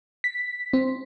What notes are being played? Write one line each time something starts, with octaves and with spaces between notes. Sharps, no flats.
B6
C4